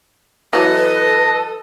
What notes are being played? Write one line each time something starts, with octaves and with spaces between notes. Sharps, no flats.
E3 F#3 A4 B4 D#5